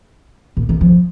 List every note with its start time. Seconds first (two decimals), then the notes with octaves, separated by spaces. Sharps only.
0.57 A#2
0.69 D#3
0.81 F3